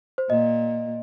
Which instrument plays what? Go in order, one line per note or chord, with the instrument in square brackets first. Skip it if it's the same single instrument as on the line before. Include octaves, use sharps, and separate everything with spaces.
[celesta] C5
[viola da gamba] A#2 A#3 [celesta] D#5